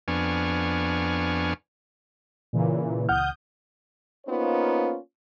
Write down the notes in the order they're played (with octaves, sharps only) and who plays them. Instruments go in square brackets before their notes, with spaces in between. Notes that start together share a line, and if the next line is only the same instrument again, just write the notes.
[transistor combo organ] F2 B3 D4 G#5 C#6 F6
[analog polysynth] A#2 C#3 E3
[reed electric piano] C#2 F#5 F6 [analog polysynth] D#6 G6
[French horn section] A#3 B3 C#4 D#4 F4 C5